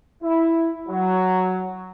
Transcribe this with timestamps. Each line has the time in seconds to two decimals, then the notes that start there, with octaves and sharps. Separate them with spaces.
0.23 E4
0.89 F#3